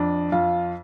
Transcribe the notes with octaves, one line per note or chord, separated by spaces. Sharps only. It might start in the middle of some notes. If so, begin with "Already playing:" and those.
Already playing: F2 D4
F2 F4